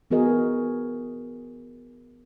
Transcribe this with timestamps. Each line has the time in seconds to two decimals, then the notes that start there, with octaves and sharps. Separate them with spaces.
0.11 E3 B3 F#4 G#4 A#4 D#5